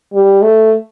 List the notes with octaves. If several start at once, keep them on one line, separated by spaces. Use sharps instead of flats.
G3
A3